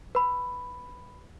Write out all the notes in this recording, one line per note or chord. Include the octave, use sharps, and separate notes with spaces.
B4 B5